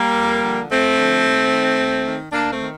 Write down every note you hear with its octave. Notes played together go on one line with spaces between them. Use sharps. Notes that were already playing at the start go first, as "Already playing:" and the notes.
Already playing: G3 A#3
F2
D3 F3
F2 A3 C4
D3 F3
D#2
D#3
D#2
D#3
D2 A#3 D4
A3 C4
D#3